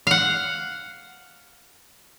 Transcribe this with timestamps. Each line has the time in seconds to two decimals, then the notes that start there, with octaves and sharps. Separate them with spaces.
0.07 F5 F#5